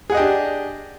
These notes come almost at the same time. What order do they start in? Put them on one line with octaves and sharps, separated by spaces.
G#4 F#5 D#5 G4 D4